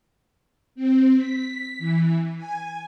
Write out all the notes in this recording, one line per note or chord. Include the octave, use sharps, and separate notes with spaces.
C4
B6
E3
G#5